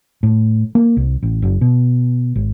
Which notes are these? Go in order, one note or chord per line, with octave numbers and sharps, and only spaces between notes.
A2
A#3
C2
A1
F#1
B2
G#1